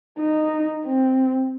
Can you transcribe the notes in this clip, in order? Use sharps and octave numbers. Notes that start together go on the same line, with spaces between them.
D#4
C4